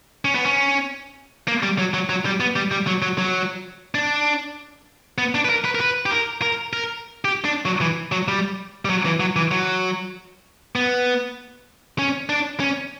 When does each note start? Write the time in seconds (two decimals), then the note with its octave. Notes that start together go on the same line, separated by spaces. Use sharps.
0.25 C#4
0.35 B3
0.46 C#4
1.48 A#3
1.63 G3
1.78 F#3
1.94 F#3
2.09 F#3
2.26 G3
2.40 B3
2.56 G3
2.72 G3
2.87 F#3
3.02 F#3
3.18 F#3
3.95 D4
5.18 B3
5.35 D4
5.45 B4
5.50 A#4
5.65 B4
5.75 A#4
5.80 B4
6.06 G4
6.11 A#4
6.42 A#4
6.73 A#4
7.25 G4
7.45 D4
7.65 F#3
7.81 E3
8.12 F#3
8.28 G3
8.85 G3
8.90 F#3
9.06 E3
9.20 F#3
9.36 E3
9.51 F#3
10.76 B3
11.99 C#4
12.29 D4
12.60 C#4